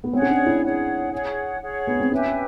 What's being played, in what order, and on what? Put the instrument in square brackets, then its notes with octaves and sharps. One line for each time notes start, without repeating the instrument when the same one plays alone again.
[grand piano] B3
[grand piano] C4 [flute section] G#4 C#5 F#5
[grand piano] C#4
D4
E4
[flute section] G#4 C#5 F#5
G#4 C#5 F#5
G#4 C#5 F#5
[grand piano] B3
C4
[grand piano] C#4 [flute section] G4 B4 E5 G#5